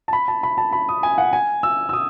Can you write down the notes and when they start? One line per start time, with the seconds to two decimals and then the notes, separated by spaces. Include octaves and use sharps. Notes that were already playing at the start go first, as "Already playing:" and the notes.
0.08 A5
0.13 B5
0.28 A5
0.43 B5
0.58 A5
0.73 B5
0.89 D#6
1.03 G#5
1.18 F#5
1.33 G#5
1.63 E6
1.89 E6
1.93 D#6